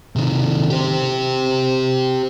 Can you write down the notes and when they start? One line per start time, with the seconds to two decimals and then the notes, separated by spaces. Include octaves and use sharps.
0.16 C3 D#3
0.70 G4 C5